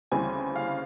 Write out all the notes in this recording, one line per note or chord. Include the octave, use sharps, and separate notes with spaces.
D2 C#3 E3 G3 C4 G#5
F5